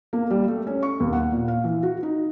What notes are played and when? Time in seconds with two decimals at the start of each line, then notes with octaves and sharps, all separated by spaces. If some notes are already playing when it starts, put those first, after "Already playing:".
0.13 A#3
0.30 G3
0.48 A3
0.67 C#4
0.83 C#6
1.00 D#2
1.13 F#5
1.32 A#2
1.48 F5
1.64 E3
1.83 F#4
2.03 D#4